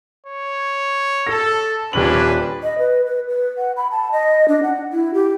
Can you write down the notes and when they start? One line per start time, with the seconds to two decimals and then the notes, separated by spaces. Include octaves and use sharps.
0.27 C#5
1.27 A4 A#6
1.93 D#1 C#4 D4 B4 F#7
2.63 D#5
2.79 B4
3.06 B4
3.29 B4
3.58 F#5
3.77 B5
3.91 A5
4.12 D#5
4.48 D4
4.63 F#5
4.93 E4
5.14 G4